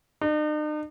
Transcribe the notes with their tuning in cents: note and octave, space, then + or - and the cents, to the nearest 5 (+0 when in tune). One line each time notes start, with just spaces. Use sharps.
D#4 -45